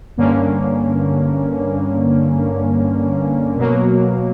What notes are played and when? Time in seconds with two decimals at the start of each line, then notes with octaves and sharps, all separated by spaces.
0.17 G2 D3 A#3 C#4
3.57 B2 F#3 A#3